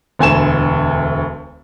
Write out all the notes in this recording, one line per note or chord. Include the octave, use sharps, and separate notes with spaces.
E1 D2 G#5 E7